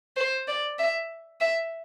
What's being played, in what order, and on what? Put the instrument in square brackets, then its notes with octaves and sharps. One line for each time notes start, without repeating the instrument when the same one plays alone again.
[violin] C5
D5
E5
E5